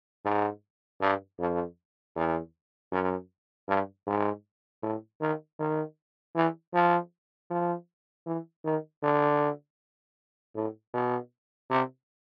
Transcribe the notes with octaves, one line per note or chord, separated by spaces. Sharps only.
G#2
G2
F2
E2
F#2
G2
G#2
A2
D#3
D#3
E3
F3
F3
E3
D#3
D3
A2
B2
C3